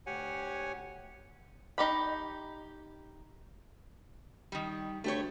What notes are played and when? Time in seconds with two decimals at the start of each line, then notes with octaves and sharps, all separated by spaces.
0.06 D2 G4 C#5 F#5 G#5
1.78 D#4 G4 B5
4.52 D#3 G3
5.04 D2 A3 G4 C#5